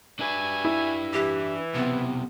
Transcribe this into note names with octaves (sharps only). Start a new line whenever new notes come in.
D4 F#4 B4 E5 G#5
E4
E3 G4
B1 C3 B3